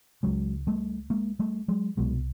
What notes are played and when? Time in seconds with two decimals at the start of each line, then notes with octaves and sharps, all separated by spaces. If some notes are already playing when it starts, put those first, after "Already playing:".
0.23 C#2 C#3 F#3 G#3
0.67 G3 A3
1.10 G#3 A#3
1.39 G3 A3
1.68 F#3 G#3
1.97 C2 B2 F#3 G#3